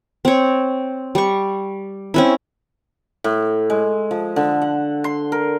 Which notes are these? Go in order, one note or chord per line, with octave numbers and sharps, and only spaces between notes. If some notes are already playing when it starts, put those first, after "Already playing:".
C4 C#5
G3 C#6
C4 C#4 E4
A2
G#3
F3
D3
F#5
C6
A#4